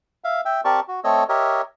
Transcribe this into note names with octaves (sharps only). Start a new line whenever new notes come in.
E5 F5
E5 G5 E6
C4 G4 A#4 D5 A5 C#6
F#4
A3 C4 A4 C#5 D#5 E6
G4 A#4 C#5 D#5 E5